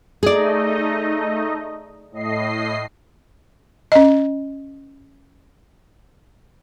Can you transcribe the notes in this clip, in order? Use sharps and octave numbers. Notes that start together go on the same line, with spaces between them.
A3 D#4 G#4 D5 D#5
A2 D#5 C7
C#4 D#5